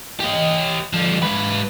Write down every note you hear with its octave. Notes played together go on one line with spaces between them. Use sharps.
G4 D#5
D3 F3
G#2 B4